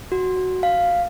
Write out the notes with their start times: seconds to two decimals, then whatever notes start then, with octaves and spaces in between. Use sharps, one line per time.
0.12 F#4
0.63 F5